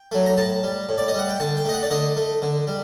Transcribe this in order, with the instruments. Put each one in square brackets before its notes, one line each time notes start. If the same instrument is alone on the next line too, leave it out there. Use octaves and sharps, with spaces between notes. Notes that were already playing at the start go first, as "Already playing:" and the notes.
Already playing: [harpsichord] G5
F#3 A3
A#5
A2 A5
G3
A2
D5
D#5
G3 F#5
G5
D3 A5
G5
A3 D#5
F#5
D5
D3 D#5
A3
D3
G3